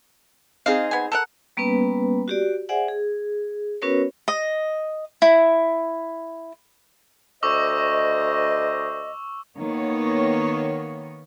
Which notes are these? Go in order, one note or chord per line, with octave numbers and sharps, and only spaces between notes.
C4 D#4 G#4 F5
B3 G#5
A4 A#4 F#5
G3 A#3 B3 C#4 B4
F#4 G4 D5
G#4 C5 D5 E5 F#5 G#5
G#4
B3 C#4 F#4 A#4 B4 C#5
D#5
E4
D2 C5 D#5 C#6 D6 E6
D#3 A#3 B3 C#5